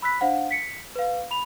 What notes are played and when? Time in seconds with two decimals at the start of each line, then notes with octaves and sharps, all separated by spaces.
0.02 B5 E6 F#6 B6
0.21 D4 C5 F5 F#5
0.51 B6 C#7
0.95 B4 F5
1.31 B5 F7